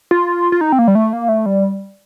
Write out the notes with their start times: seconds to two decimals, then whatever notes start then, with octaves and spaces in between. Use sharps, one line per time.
0.11 F4
0.52 F4
0.61 D#4
0.72 C4
0.79 A#3
0.88 G3
0.95 A3
1.13 A#3
1.29 A3
1.46 G3